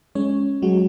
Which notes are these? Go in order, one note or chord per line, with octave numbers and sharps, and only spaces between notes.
G#3 C#4 C#5
F#3 G#3 F#4